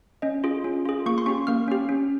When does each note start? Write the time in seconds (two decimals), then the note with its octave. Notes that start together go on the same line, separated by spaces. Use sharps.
0.22 C#4 D#5
0.44 F4 G#4
0.64 C#4
0.85 F4 G#4
1.06 A#3 C#6
1.18 C6
1.26 C#4 G4 C#6
1.47 A#3 F6
1.68 C#4 G4
1.89 C#4